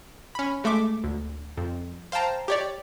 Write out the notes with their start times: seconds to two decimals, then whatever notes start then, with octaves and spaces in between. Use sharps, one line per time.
0.35 C#4 B5
0.64 G#3 A3 E5 D6
1.04 D2
1.57 F2
2.12 C5 F5 G5 A5 A#5
2.48 G4 C#5 D5